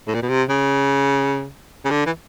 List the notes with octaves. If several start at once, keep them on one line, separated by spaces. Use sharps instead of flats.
A2
A#2
B2
C3
C#3
C#3
D3
E3